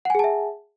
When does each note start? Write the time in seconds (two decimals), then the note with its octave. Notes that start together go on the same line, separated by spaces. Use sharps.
0.05 F#5
0.10 G#5
0.15 G#4
0.19 A5
0.24 E5